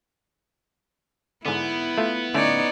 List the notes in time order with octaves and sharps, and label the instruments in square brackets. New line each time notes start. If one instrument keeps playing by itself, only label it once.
[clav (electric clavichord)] G#2 D3 [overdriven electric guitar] B3 [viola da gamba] E4
[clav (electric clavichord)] A3 F4
[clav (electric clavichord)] D3 A3 C#4 [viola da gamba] D#4 C#5 D5